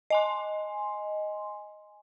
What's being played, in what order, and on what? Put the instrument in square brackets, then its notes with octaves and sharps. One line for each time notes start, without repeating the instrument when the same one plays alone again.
[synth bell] D#5 G#5 C6